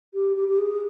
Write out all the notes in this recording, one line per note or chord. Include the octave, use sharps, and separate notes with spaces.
G4
G4
G4
G#4